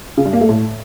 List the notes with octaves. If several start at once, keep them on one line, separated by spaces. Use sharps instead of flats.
C#3
G2
A#3
A3
A2